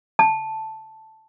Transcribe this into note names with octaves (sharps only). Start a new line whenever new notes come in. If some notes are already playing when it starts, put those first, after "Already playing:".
A5